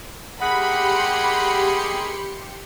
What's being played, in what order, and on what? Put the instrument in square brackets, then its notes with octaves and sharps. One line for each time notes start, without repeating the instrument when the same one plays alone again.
[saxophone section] A#3 D#4 G#4 [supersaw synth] G4 C6 C#7 [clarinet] F#5 [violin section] B5